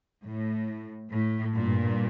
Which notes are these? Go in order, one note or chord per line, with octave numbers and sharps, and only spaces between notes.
A2
A2
G2 A#2